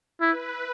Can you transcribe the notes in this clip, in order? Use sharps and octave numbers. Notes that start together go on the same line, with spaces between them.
E4 B4